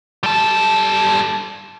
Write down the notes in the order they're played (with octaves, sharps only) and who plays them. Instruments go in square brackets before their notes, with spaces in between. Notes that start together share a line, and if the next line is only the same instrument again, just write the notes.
[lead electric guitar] G3 A4